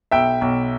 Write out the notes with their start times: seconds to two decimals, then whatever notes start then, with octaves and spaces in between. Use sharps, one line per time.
0.11 B1 E5 G5
0.41 B1